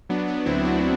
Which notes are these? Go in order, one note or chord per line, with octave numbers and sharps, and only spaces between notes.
F#3 B3 D4
B3 D4
D2 C4 E4
D4 F#4